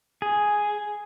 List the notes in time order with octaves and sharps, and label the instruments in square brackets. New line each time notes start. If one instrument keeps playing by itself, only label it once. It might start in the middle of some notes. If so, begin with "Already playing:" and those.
[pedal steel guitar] G#4